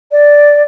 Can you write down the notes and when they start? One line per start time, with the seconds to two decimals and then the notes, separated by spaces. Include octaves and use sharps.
0.12 D5